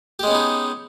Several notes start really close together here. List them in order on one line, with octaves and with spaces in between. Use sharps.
G4 G#3 C#4 B3 D#4